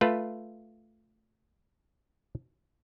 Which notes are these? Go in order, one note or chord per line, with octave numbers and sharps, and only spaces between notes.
A3 F4 B4